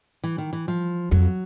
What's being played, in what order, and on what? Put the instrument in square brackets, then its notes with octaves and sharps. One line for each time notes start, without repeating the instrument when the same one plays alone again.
[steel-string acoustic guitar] E3
D#3
E3
F3
[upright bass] F2 [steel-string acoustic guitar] F#3